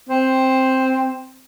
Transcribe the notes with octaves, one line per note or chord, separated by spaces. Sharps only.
C4